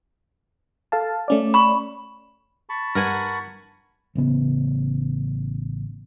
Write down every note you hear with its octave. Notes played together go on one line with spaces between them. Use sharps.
A4 F5 A5
A3 C#4 D5
B5 C#6
A5 B5 C#6
G2 A#4 F#5 G#5
A1 C#3 B3